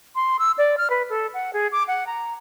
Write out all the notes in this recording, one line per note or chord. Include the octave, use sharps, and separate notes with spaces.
C6
E6
D5
F6
B4
A4
F#5
G#4
D6
F#5
A#5